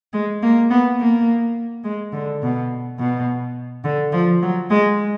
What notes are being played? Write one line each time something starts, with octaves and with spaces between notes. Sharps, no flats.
G#3
A#3
B3
A#3
G#3
D3
B2
B2
D3
F3
F#3
G#3